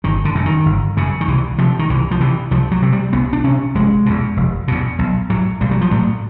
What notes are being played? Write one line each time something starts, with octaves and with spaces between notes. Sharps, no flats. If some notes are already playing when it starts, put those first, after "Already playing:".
G1 D#3
D3
F#2 C#3
D#3
G1
F#2 C#3
D#3
C2 E3
C3 F3
D#3
C2 E3
F3
C3 E3
C2 F3
F#3
C3
G3
C2 B3
D4
C3 C#4
F1 G#3
E2 B2
F1
E2 B2
B1
A2 F#3
B1 G3
F#3
F3
A2 F#3